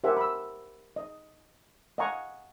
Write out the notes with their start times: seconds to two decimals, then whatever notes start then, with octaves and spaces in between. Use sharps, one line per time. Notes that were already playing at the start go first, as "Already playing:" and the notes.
0.04 G4 A#4 C5 E5 F#5 G#5
0.17 B5 E6
0.96 D#5
1.98 D#5 F5 F#5 G#5 A#5 C#6